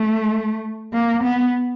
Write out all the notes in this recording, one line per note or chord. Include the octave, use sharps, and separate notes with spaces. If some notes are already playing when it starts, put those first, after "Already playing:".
Already playing: A3
A#3
B3